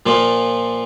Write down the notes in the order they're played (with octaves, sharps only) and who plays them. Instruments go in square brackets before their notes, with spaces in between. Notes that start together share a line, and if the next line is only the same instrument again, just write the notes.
[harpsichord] A#2 F3 A#3 F4